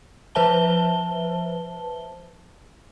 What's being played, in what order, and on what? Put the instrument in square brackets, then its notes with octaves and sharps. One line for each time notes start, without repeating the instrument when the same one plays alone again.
[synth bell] F3 B4 C5 E5 A5 G7